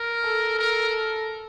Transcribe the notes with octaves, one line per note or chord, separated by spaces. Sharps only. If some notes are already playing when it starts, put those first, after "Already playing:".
Already playing: A#4
A4
A#4